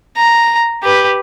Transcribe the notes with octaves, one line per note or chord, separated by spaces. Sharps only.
A#5
G4 B4